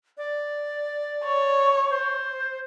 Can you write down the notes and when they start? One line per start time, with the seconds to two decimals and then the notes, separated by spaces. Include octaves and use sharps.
0.18 D5
1.24 C#5
1.90 C5